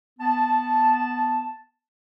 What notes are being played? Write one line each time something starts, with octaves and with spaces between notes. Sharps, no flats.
B3 A5